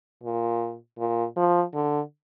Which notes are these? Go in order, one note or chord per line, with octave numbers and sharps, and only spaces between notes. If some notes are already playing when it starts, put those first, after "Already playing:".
A#2
A#2
F3
D3